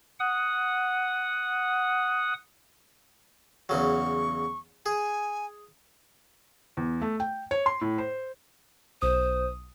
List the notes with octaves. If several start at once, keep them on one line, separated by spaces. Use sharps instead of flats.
F#5 D#6
E2 C#3 F#3 C#6
G#4 G#5
E2
A3
G5
C#5
C6
A2
C5
B1 C5 D#6